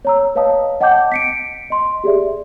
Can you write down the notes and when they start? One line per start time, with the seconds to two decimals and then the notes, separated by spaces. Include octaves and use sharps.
0.05 C#5 A#5 E6
0.35 B4 C#5 D#5 F5 A5 D#6
0.81 D#5 F#5 G5 A5 D6 G6
1.12 B6 C#7 D7
1.70 D#5 C6
2.04 G4 G#4 D5 E5